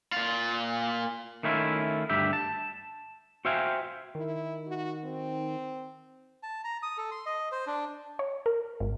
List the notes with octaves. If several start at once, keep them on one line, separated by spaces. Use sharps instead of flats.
A#2 F4
D#3 A3 C#4 E4 F4
D2 G2 G4 E5
A5
F#4 C5 E5 F5 G5 G#5
D#3 E4
F#4
C4
A5
A#5
D#6
A4
C6
D#5
C5
D4
C#5
A#4
G#1